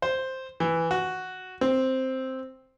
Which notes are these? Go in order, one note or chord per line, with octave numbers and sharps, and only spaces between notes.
C5
E3
F#4
C4